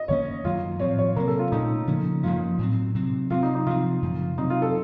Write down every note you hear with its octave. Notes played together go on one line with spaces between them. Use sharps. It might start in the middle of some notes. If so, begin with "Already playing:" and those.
Already playing: D#5
F#2 D#3 A#3 C#4 C#5
F#2 D#3 F#3 A#3 F4
A2 F3 C4 C#5
C#5
C3 F#3 A#3 A#4
A4
F4
A#2 A3 C#4 D#4
C#3 F3 A#3 C#4
F#2 F3 A#3 C#4 F4
A2 F#3 C4
C3 F#3 C4
C3 F#3 C4 F4
D#4
D#4
C3 F3 C4 F4
F#2 C#3 F3 A3
C3 F#3 C4 D#4
F4
A4